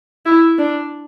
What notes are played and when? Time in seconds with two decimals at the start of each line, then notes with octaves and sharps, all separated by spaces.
0.26 E4
0.58 D4